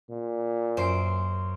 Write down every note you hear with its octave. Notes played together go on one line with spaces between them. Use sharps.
A#2
F#2 C5 C7 D7